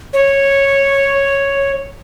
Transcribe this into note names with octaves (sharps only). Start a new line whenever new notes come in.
C#5